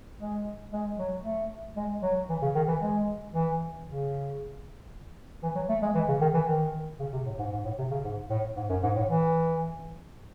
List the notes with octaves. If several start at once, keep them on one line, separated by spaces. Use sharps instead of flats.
G#3
G#3
F#3
A3
G#3
F#3
E3
C#3
D#3
E3
G#3
E3
C#3
E3
F#3
A3
G#3
E3
C#3
D#3
E3
D#3
C#3
C3
A2
G#2
G#2
A2
C3
C#3
G#2
A2
G#2
F#2
G#2
A2
E3